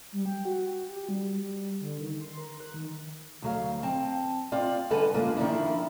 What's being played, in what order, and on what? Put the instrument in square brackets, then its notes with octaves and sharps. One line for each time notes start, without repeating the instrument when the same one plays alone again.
[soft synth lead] G3
G5
F#4
G4
G3
G3
D3
D#3
C6
A#4
F#6
D#3
[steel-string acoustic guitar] D2 F#3 F5
C4 A5
C4 F4 D5
D3 G3 A4 B4 F#5 G#5
F#2 D3 G#3 A#3 D4 F4
D#3 F3 F#3 D4 E4